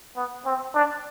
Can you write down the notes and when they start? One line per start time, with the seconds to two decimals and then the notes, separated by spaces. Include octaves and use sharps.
0.16 B3
0.45 C4
0.74 D4